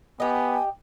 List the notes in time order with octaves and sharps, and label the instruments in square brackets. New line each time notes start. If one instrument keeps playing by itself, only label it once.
[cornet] B3 [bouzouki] G4 D#5 [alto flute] G#5